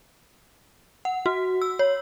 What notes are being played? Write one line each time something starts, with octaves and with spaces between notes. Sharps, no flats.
F#5
F#4
E6
C#5